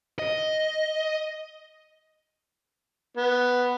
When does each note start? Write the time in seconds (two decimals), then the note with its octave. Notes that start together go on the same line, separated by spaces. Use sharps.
0.19 D#5
3.17 B3